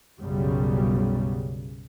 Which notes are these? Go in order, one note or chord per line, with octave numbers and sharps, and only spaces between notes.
B1 F#2 C#3 G3